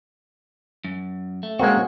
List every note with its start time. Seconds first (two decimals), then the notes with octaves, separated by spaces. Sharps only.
0.85 F#2
1.43 A3
1.59 G#3 A#3 C4 C#4 F#4